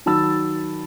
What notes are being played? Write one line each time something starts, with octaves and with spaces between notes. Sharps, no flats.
D#3 F#3 A5 B5 E6 A6